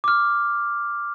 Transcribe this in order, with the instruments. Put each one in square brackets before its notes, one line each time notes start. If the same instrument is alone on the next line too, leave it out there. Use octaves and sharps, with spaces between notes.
[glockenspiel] D6 F6